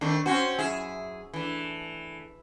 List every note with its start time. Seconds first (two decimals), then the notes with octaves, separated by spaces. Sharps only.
0.01 D#3 A3 C4 D4 D5
0.26 C4 C#4 F#4 C5
0.59 F#2 E4 G#4 E5
1.34 E3 A3 D4